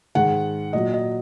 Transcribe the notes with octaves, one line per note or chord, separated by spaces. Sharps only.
G#2 D#3 G#3 F#5
A#2 F#3 D#5
D#5